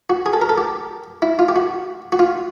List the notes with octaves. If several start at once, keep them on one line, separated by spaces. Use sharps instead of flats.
F#4
G#4
A4
A#4
A4
G4
E4
F4
G4
F#4
F#4
F4